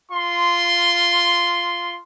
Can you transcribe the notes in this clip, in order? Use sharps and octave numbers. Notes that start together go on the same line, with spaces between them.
F4 C6